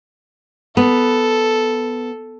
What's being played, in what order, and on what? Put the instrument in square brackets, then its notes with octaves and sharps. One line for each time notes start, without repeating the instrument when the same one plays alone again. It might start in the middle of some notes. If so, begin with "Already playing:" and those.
[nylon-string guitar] B3 [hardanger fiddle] A4